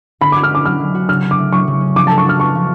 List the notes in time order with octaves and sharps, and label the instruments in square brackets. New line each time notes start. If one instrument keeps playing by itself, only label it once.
[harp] D3 [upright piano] B5
[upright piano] D6
[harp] F#4
[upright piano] F6
[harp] C#4 [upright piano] D6
[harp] F#3 [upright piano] F6
[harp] D3
F#4
[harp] C#3 [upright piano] F6
[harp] C#4
[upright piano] D6
[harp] A3
[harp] F#3 [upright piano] C#6
[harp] C#3
C#4
[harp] F3 [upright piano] D6
[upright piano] A5
[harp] A4
[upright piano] C#6
[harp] F#4 [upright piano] F6
[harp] B3 [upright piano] C#6
[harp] F3